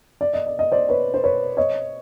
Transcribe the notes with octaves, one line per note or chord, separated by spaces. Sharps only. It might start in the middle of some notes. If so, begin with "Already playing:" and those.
D5
D#5
D5
D#5
C5 D5
B4 C#5
C5
B4 C#5
C#5 D#5